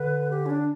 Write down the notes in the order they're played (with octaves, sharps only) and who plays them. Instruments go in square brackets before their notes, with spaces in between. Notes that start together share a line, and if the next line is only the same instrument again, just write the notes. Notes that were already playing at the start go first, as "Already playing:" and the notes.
Already playing: [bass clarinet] D3 [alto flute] B4
[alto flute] G4
C#4
D4